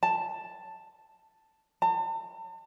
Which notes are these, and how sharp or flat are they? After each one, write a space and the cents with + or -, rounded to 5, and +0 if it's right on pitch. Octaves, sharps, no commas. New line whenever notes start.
A5 +5
A5 +40